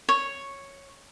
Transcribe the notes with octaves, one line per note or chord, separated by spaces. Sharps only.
C#5